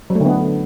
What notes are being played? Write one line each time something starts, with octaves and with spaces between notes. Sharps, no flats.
F#3
A3
D3
B3